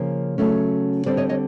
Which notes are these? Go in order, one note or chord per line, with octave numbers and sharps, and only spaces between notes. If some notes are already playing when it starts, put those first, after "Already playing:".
Already playing: C#3 F3 A#3 C#4
C#3 F#3 A3 C#4
D3 G3 C4 C5 D5
C#5 D#5
C#5 D#5